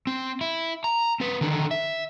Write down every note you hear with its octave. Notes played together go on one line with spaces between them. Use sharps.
C4
E4
A#5
C4 B4
D3 D#3
E5